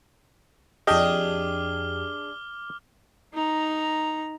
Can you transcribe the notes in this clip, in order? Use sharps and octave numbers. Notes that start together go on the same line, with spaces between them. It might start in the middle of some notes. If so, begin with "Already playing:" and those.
F2 D4 G4 G#4 D#5 D6 F6 G7
D#4 A#5